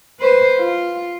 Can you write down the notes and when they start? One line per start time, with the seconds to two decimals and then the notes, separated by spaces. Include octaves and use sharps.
0.20 B4 C5
0.59 F4